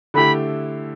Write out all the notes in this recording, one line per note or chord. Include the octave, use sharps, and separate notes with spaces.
D3 A3 E4 G4 B5